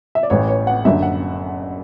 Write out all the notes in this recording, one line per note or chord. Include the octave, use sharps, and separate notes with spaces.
E5
D5
A1 A2 E3 C#5
C#5
F#5
F#1 F#2 D3 E5
F#5